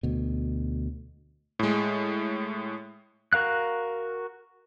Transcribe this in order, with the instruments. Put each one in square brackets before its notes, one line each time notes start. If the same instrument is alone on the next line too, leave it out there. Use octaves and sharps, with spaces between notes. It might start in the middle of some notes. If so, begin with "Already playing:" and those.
[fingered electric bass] D2 B2
[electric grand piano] A2 G#3
[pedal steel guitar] F#4 A#4 F5 F#6